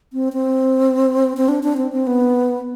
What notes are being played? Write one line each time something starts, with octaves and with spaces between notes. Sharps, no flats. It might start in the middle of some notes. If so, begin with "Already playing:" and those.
C4
C4
C4
D4
D4
C4
C4
B3